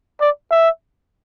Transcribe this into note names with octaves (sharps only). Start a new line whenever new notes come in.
D5
E5